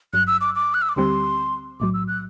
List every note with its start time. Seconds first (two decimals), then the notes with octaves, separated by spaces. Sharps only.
0.13 G1 G2 F#3 F#6
0.27 E6
0.41 D6
0.55 D6
0.74 F#6
0.82 E6
0.89 D6
0.96 D2 D3 G3 C4 G4 C6
1.80 B1 A2 F#3 D6
1.94 E6
2.08 F#6